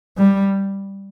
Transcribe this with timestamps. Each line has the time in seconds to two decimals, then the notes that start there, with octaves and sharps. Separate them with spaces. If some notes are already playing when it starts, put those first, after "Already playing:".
0.17 G3